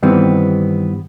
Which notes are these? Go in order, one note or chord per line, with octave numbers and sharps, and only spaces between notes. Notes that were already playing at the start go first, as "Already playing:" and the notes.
G2 D#3 E3 G3 B3 C4